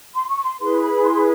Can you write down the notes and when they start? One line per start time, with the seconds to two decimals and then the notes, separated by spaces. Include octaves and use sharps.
0.14 C6
0.29 C#6
0.45 C6
0.60 E4 G#4 B4 C6
0.82 B5
1.05 C6